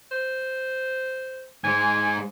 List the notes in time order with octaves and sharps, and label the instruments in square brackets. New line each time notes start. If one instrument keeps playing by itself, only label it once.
[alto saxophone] C5
[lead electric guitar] G#2 G#3 [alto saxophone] G#5